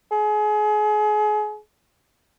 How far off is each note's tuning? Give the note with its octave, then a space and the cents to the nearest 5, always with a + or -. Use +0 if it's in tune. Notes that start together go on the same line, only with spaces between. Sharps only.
G#4 +30